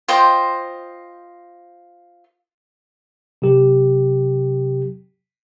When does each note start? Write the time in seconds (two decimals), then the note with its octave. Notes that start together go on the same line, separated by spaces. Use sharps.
0.08 F4 C5 D#5 G5
3.42 C3 F#3 G4